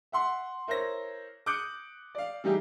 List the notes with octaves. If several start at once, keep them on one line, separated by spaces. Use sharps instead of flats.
E5 F#5 C6
E4 A#4 C5 C#5 A#6
D6 D#6 F#6 G6 C#7 D7
D5 F5
E3 G3 D#4 G4 G#4